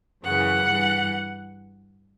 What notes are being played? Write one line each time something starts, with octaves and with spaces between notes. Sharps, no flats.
F#2 C#3 E3 F#5
G2 E3